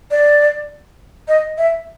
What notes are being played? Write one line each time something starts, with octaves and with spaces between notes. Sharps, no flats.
D5
D#5
E5